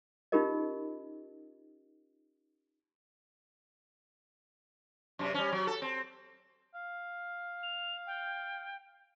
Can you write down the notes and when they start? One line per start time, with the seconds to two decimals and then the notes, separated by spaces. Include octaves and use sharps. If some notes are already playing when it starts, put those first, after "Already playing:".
0.32 C#4 D#4 F4 G4 A#4 D#5
5.19 F#2 C3
5.34 G3 C#4
5.52 F#3
5.67 A4
5.82 C4
6.74 F5
7.63 F7
8.07 G5